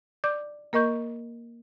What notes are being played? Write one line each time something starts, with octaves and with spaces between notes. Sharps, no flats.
D5 D6 G6
A#3 A#4 D#5 C#6 G6